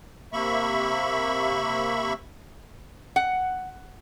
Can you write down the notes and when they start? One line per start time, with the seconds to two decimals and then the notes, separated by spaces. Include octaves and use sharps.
0.33 C3 A#3 E5 B5 C#6
3.16 F#5